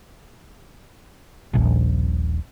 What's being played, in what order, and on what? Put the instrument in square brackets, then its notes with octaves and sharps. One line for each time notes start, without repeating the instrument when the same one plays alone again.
[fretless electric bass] D#1 A#1